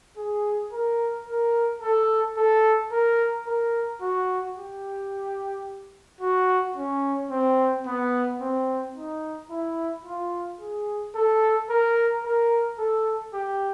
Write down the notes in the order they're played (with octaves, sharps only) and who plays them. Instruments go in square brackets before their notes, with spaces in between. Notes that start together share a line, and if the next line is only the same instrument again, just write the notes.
[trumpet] G#4
A#4
A#4
A4
A4
A#4
A#4
F#4
G4
F#4
C#4
C4
B3
C4
D#4
E4
F4
G#4
A4
A#4
A#4
A4
G4